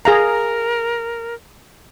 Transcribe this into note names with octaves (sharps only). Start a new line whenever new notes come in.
G#4 A#4 F5 A#5